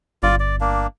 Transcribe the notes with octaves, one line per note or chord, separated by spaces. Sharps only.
G1 F4 D5
D5
A#3 D4